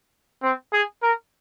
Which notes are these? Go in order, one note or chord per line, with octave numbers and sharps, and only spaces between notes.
C4
G#4
A#4